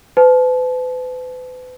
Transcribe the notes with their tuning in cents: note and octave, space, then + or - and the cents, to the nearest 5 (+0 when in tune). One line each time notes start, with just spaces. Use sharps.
B4 +40 A5 -30